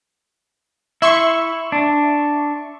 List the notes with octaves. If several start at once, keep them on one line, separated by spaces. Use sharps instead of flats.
E4 E5 C6 C#6
D4